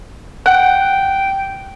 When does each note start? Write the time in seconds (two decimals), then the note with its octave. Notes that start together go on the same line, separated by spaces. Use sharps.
0.46 F#5 G5